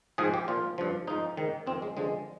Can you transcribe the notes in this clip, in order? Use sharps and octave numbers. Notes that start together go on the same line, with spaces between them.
G#2 F3 G#4
G4
A#2 F3 F4
G2 F3
G#2 F3 D#4
G#2 D#3
F2 D#3 C4
G#3
G2 D3 F3 G#3